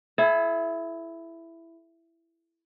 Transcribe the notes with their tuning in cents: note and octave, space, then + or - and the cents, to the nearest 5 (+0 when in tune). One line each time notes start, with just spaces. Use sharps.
E4 +10 A4 -45